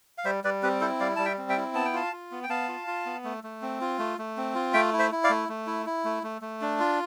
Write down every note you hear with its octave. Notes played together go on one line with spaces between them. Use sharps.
F5
G3 C5 E5
G3 B4 D5
C4 G4 B4
E4 A4 C5
G3 D5 F5
G3 A5
E5 G5
C4
E5 G5
E4
B3 A5
G5
F4 F5 A5
F4
B3
G5
B3 F5 A5
F4
F4
B3
A3
A3
C4
F4
A3
A3
C4
F4
A3 E5 G5
E4
C5 E5
E4
D5 F5
A3
A3
E4
E4
A3
A3
A3
D4
F4